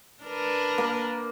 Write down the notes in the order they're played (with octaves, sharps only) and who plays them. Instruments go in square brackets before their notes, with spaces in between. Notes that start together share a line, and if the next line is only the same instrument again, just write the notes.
[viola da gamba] D4 A#4 B4
[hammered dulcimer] A#3